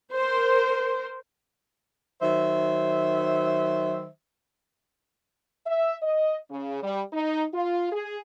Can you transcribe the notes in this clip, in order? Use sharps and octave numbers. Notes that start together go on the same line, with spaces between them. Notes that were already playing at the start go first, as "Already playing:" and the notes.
A#4 C5
D#3 F#3 C5 E5
E5
D#5
C#3
G3
D#4
F4
G#4